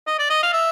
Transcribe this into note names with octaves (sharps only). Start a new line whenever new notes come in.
D#5
D5
D#5
F5
E5